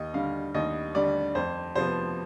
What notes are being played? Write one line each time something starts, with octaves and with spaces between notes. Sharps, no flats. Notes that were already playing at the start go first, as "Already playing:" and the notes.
Already playing: D#2 D#5
D3 G3 F5
D#2 D#5
D3 G3 D5
F2 C5
C3 F3 B3 C5